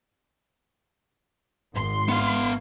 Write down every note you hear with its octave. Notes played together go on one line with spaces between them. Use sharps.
G#1 C6
B3 F5